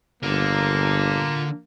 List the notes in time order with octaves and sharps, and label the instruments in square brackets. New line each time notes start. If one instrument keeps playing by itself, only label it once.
[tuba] G1 [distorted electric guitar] D3 [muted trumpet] A#3 [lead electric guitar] F4 A#4